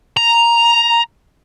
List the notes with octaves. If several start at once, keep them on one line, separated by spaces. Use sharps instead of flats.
A#5